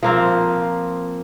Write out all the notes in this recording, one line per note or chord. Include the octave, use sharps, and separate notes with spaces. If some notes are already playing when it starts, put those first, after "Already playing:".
F3 A#3 C4